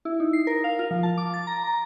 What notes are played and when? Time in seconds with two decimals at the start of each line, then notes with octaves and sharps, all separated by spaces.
0.05 E4
0.20 D#4
0.33 C7
0.47 A#4
0.64 F5
0.79 F4
0.91 F3
1.03 A5
1.17 D6
1.34 A6
1.47 A#5
1.64 A#5